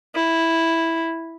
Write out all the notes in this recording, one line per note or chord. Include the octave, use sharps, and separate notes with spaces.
E4